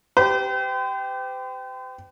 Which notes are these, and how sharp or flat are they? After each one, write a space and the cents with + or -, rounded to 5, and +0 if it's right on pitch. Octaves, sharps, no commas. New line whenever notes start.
G4 -5 C5 -45